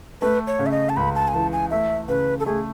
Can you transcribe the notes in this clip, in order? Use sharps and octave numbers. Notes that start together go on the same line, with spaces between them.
A3 B4
C#5
C#3
E5
D#5
A5
C#2 B5
A5
G#5
E3 A5
G#5
A3 E5
C#3 B4
A4
A3 G#4